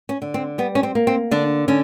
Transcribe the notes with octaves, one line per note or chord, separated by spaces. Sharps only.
C#4
D3
C4
G3 B3
C#4
C4
A#3
C4
D3 D4
D3 C#4